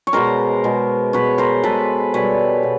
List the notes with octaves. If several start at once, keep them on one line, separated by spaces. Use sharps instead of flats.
C#5
B2 G#3 A#4 C5
B2 G#3
B2 G#3 B4 C#5
A#4 C5
B2 G#3 A4 B4
B2 G3 B4 C#5
B2